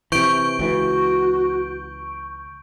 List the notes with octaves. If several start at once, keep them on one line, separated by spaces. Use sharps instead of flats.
C3 E3 C#6 G6 D7
C#2 E3 F#4